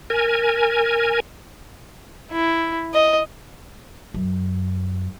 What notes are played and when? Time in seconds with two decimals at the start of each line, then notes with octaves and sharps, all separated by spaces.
0.10 A#4 G#5
2.31 E4
2.94 D#5
4.14 F#2